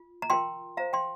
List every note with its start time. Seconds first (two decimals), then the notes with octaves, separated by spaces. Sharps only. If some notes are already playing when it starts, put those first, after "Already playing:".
Already playing: F4
0.22 A#5
0.30 F4 A#4 G5 C6
0.77 F4 C5 F5 A#5
0.93 G5 C6